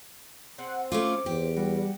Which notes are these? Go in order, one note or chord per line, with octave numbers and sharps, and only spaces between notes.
C4 G#4 C5 F#5
A3 C#4 F4 D6
E2 G4
G3 F#4